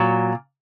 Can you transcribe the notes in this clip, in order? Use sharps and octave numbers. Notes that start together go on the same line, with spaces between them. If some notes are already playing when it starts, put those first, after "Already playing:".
Already playing: A#2 F#3